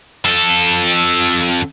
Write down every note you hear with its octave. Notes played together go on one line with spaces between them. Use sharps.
F2 A4